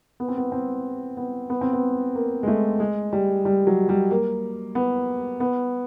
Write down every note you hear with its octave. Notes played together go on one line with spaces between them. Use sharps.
B3
C4
B3
C4
B3
B3
C4
B3
A#3
G#3
A3
G#3
G3
G3
F#3
G3
A#3
B3
B3